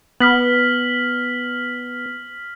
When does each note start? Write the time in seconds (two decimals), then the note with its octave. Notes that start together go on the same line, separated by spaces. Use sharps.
0.20 B3 F6 B6 F#7